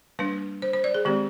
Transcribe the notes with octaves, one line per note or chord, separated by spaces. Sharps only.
G3 A#3 D4 B4
C5
C5
D5
G#4
D#3 G#3 C4 G4